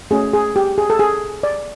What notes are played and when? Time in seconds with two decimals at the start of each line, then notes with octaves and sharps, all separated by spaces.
0.11 A3 C#4 F#4 G#4
0.34 G#4
0.56 G4
0.78 G#4
0.90 A4
1.00 G#4
1.43 D5